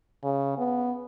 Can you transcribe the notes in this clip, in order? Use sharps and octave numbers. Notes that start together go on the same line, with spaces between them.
C#3
B3